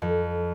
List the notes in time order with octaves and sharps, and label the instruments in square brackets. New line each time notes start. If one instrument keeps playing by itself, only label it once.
[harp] F2